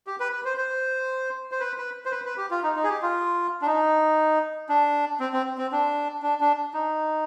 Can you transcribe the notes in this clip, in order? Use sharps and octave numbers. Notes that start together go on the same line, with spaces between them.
G4
B4
B4
C5
C5
C5
B4
B4
C5
B4
B4
G4
F4
D#4
D#4
G#4
G4
F4
D4
D#4
D4
C4
C4
C4
D4
D4
D4
D#4